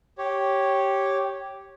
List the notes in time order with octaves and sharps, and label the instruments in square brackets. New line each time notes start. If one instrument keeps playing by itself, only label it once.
[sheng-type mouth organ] G4 C#5